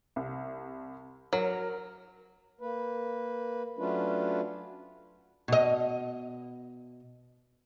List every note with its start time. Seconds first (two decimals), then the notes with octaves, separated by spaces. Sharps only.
0.16 C2
1.33 F#3 A#4
2.61 A#3 B4
3.78 F#3 A3 C#4 D4 F4 B4
5.48 B2 D#5